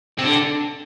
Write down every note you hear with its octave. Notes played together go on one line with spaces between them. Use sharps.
C3
D3